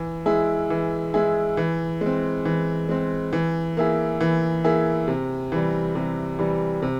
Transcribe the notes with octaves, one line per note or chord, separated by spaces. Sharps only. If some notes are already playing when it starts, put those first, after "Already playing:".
Already playing: E3
G#3 E4 G#4
E3
G#3 E4 G#4
E3
G#3
C4
E3
G#3 C4
E3
A#3 E4 G#4
E3
A#3 E4 G#4
C3
E3 G3
C3
E3 G3
C3